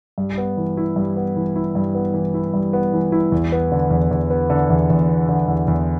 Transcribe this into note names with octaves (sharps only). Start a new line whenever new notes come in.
G2
B3
E3
E4
G2
B3
E3
E4
G2
B3
E3
E4
G2
B3
E3
E4
E2
B3
D3
E2
E2
B3
D3
E2
E2
B3
D3
E2
E2